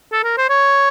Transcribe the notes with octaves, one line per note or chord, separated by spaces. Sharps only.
A4
A#4
C5
C#5